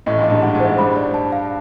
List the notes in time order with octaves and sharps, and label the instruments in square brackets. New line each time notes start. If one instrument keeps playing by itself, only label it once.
[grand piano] A1 A2 [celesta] D#5
[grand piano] A#1 A#2
[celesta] D#5
[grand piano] G2
[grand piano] G#2 [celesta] F#5
[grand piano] A1 A2
[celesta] C5
[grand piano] G#2
[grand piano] G2 [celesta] B5
[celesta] D5
A5
F5